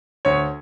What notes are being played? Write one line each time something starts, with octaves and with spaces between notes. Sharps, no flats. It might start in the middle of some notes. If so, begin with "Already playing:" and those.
D2 C#5